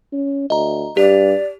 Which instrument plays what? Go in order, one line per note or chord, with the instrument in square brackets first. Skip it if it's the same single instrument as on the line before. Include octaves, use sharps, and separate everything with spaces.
[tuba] C#4
[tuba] D2 [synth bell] D#5 A#5
[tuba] G2 [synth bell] G4 [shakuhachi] D5